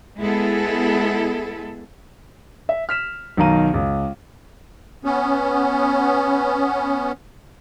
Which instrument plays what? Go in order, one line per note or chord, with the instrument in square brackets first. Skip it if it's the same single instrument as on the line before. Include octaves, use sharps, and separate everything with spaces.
[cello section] G#3 B3 E4 G#4 A4
[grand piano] E5
F6 B6 E7
B1 D#3 F5 A#5 D#7
C#2
[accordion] B3 C#4